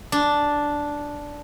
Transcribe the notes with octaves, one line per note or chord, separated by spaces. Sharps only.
D4